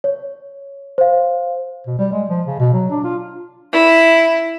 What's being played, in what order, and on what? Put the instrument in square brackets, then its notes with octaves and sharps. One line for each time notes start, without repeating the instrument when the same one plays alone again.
[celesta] C#5
C5 F5
[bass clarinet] B2
G3
G#3
F3
C#3
B2
F#3
D4
F4
[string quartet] E4